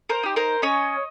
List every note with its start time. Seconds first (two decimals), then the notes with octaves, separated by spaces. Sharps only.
0.09 A#4 C5
0.23 D#4 G4
0.36 A#4 C5
0.62 C#4 C#5 D#5